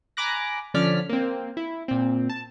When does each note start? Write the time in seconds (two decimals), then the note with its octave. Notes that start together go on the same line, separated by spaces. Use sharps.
0.17 G#5 A#5 B5 D6 F#6 A#6
0.74 D3 F3 C#4 D5 F6 B6
1.09 A#3 C4
1.57 E4
1.88 A#2 C4
2.29 A5